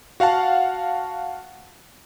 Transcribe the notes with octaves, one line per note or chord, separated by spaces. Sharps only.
F#4 F5 F#5 A5